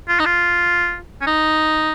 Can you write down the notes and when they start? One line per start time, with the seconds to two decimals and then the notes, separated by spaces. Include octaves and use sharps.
0.09 F4
0.20 D#4
0.26 F4
1.21 C#4
1.27 D#4